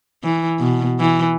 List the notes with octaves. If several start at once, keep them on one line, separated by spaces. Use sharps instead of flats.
E3
B2
E3